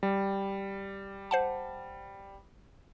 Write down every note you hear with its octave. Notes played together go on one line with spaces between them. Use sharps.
G3
C5 F#5 A5